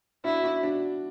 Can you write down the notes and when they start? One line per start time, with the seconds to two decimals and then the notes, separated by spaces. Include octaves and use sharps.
0.24 D4 E4 F#4
0.43 D4 F#4
0.63 D4 F#4